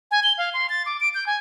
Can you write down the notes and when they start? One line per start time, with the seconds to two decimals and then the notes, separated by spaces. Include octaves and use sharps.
0.11 G#5
0.23 G7
0.38 F5
0.54 C6
0.69 A6
0.86 D6
1.00 D7
1.14 G6
1.26 G#5